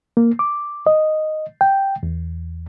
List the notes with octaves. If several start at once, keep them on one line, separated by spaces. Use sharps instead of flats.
A#3
D6
D#5
G5
E2